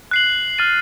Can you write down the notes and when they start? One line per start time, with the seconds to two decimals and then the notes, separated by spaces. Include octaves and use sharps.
0.11 F#6 C7 F#7
0.58 F6 A6 D#7